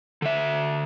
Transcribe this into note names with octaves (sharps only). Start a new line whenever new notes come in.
D3 E5